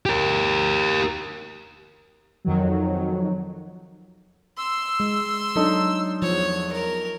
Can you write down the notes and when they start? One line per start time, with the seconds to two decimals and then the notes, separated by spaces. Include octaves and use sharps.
0.06 G4 A#4
2.45 F2 D#3 F#3
4.58 C6 E6
5.00 G#3
5.56 F#3 D4 D#4 A4
6.22 E2 F3 C#5
6.72 A#4